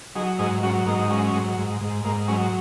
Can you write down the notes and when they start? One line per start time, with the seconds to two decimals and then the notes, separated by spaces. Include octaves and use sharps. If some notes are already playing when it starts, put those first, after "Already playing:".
0.15 F#3 D#4 G#4
0.39 G#2 D#4 G#4
0.63 F#3 C#4 F#4
0.86 G#2 A#3 D#4
0.99 D#4
1.09 F#3 G#3 C#4
1.34 G#2
1.58 G#2
1.81 G#2
2.05 G#2 A#3
2.28 F#3 G#3 C#4